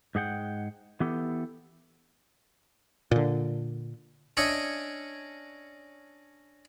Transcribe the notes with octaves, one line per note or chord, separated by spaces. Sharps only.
G#2 G#4 F#5 G5
E3 B3 G4 A4
A#2 D3
C#4 D4 C#5 D#5 E5